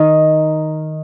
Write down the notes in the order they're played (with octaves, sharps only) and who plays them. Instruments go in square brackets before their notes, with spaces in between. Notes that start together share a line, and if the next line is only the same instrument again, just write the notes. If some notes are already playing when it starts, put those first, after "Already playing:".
Already playing: [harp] D#3 D#4